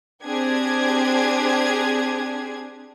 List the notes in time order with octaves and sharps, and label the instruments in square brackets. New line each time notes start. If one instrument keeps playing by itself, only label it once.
[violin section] C4 D4 G4 G#4 G#6